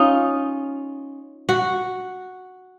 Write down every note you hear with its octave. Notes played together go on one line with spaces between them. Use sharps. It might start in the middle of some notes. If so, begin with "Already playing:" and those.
Already playing: C#4 D#4 F4
F#4